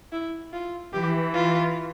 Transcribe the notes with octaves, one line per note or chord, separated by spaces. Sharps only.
E4
F4
E3 G4
F4